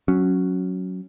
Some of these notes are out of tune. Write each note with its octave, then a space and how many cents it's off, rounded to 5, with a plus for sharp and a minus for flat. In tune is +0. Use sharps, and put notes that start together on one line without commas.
F#3 +0 C#4 +0